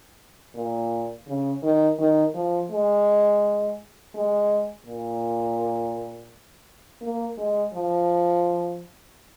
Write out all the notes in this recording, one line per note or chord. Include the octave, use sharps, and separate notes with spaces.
A#2
C#3
D#3
D#3
F3
G#3
G#3
A#2
A#3
G#3
F3